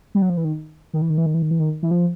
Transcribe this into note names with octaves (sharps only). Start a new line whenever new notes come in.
G3
F#3
F3
E3
D#3
D#3
E3
D#3
E3
D#3
E3
D#3
E3
D#3
E3
F3